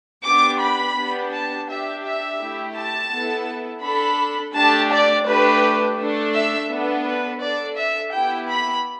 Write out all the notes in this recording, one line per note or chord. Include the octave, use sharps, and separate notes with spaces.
B3 D4 G4 D6
B5
B3 D4 G4
A5
D4 G4 E5
E5
A3 E4 G4
A5
B3 E4 A4
D4 A4 B5
A3 D4 G4 A5
D5
A3 D4 G4 B4
A3 D4 A4
E5
B3 D4 A4
B4
D4 A4 D5
E5
B3 E4 G4 G5
B5